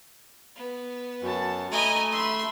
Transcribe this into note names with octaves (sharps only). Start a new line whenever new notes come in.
B3
F#2 F#4 A5
A3 D#5 G#5 A#5 B5
E5 B5 C6